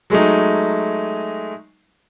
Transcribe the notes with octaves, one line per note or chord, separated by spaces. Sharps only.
F#3 G#3 A3 D#4